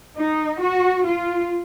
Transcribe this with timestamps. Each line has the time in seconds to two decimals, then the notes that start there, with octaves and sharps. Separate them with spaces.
0.16 D#4
0.61 F#4
1.05 F4